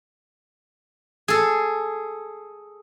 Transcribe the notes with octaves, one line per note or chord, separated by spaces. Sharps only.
G#4 A4